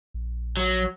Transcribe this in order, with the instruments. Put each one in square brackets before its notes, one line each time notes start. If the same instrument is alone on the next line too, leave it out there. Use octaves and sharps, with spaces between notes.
[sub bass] A#1
[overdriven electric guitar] F#3